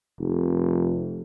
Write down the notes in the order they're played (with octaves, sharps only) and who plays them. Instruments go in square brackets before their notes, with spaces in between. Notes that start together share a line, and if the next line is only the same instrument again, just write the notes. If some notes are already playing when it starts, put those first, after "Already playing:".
[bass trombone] F1